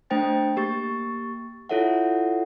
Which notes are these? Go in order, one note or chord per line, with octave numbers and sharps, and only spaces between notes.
A3 D4 C5 G5 A6
A#3 G4 C#6 A6
E4 F4 A4 C#5 E5 F#5